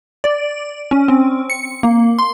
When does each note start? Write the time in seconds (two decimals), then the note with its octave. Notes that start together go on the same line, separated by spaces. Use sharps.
0.24 D5
0.91 C#4
1.08 C4
1.50 C#7
1.83 A#3
2.19 C6